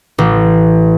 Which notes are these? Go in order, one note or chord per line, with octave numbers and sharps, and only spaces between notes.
A1